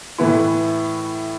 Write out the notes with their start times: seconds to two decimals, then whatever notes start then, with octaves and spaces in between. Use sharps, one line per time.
0.18 A2 E3 B3 E4